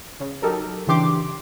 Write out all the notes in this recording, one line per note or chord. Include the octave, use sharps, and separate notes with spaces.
C#3
F#3 D#4 G4 A4 A#4
C#3 E3 D4 G4 C6 D6